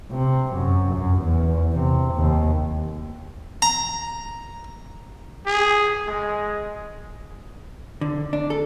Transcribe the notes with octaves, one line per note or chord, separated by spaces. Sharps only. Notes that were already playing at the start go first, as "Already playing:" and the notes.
C3
F#2
F#2
E2
C3
D#2
A#5
G#4
G#3
D3
D4
A4